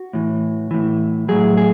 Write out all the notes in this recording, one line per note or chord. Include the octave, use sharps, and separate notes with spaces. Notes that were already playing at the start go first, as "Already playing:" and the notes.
Already playing: F#4
A2 E3
A2 E3
A2 F#3 G#4
G#4